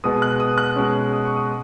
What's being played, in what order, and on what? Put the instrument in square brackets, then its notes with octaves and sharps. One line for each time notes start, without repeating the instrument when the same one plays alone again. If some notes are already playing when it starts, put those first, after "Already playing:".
[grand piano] B2 G#3 B3 D#6
F#6
D#6
F#6
B2 G#3 C#4
D#6
C#6
D#6